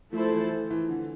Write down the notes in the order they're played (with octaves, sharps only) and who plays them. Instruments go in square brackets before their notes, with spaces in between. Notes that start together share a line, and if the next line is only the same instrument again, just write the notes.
[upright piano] F3 [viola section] A3 E4 A4 C5
[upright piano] E3
F3
E3
D3